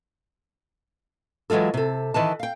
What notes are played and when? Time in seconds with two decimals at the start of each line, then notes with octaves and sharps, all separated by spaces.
1.50 E3 F#3 G#3 F4 A4
1.74 C3 A4
2.14 D#3 E3 B4 A5
2.40 F5 G5